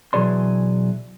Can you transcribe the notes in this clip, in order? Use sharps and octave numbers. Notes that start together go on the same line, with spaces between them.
B2 E3 F#3 G#4 D5 C6